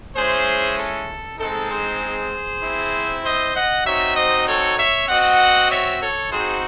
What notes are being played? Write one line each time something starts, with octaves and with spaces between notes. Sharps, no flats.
G#3 C#4 E4 G#4 C5
A4
G#3 C4 D#4 A4
G#4 C5
C4 E4
C5 D#5
D#5 F#5
C4 D#4 F#4 C#5 E5
C5 D#5
A4 C#5
C#5 E5
C4 F#4 D#5 F#5
C#5 E5
A4 C#5
C4 D#4 F#4 G#4 C5